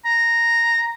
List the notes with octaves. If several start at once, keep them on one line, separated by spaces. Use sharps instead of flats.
A#5